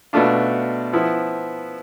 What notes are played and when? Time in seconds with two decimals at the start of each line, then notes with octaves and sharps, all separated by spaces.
0.13 B2 A3 D4 F4
0.93 F3 B3 E4